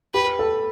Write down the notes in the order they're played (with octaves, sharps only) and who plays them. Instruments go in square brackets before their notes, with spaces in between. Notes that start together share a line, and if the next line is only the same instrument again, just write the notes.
[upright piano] G4 [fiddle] B4
[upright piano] A4